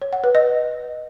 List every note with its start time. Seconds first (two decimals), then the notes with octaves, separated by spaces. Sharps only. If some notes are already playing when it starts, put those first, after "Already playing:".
0.02 C#5
0.13 F#5
0.24 B4
0.35 D#5